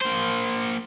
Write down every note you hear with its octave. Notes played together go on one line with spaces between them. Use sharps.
A#3 C5